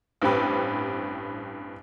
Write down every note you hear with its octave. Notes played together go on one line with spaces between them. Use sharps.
A1 G2 C4 G4 B4